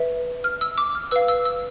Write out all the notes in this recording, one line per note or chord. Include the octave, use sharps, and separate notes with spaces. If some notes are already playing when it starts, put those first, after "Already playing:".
Already playing: B4 E5
F6
E6
D6
F6
B4 F5 E6
E6
E6